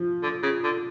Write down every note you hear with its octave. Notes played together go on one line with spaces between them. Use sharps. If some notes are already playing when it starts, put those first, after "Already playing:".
Already playing: F3
D3
C#3
D3